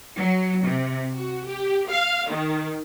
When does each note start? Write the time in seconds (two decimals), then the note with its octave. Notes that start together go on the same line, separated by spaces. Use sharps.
0.17 F#3
0.65 C3
1.17 F#4
1.46 G4
1.89 F5
2.29 D#3